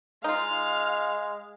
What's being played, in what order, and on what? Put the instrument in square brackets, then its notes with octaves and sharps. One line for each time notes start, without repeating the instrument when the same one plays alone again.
[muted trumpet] G#3 [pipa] D#4 F4 [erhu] F5